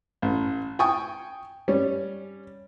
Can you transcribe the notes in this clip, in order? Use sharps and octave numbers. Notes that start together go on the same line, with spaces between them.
A1
G5 G#5 C#6 D#6
G3 C#4